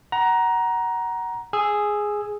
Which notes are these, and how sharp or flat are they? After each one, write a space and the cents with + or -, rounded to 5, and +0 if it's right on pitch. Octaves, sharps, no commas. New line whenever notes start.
F#5 +20 A#5 +15
G#4 +0 E6 +0